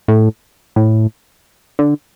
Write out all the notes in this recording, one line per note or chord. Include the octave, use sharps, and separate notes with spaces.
A2
A2
D3